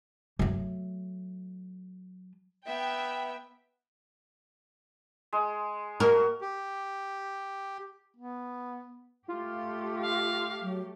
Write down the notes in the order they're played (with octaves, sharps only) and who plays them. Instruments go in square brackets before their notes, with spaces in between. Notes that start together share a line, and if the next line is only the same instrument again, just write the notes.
[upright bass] F#3 A3
[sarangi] B3 [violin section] E5 G5
[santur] G#3
[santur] A#3 F#4 D#5 [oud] A#4
[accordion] G4
[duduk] B3
[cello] A3 G4 [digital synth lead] F4
[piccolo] F5
[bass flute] F#3